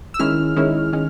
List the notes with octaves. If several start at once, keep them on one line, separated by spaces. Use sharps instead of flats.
E6
D#3 G#3 C#4 E4 F6
D#3 G#3 C#4 E4
D#3 G#3 C#4